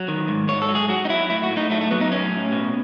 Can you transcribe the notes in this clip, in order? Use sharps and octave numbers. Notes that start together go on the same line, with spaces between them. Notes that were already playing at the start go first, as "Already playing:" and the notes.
Already playing: F#3
D#3
G#2
G#2 C#5
A4
F#3
G#4
F#3 F#4
D#4
F#3 E4
A2 E4
F#4
A2
D#4
F#3 A3
A3
F#3 B3
D#4
A2 C#4
A2
B2